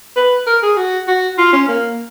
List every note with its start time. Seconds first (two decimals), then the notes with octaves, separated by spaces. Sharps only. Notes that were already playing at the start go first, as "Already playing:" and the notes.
0.17 B4
0.47 A#4
0.63 G#4
0.77 F#4
1.08 F#4
1.38 F4
1.53 C#4
1.68 A#3